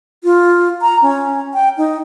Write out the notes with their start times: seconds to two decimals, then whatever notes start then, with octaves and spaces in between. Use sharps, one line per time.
0.24 F4
0.82 A#5
1.02 C#4
1.54 G5
1.78 D#4